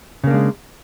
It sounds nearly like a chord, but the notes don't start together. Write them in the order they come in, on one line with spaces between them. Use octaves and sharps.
C#3 A#3 D4 G#3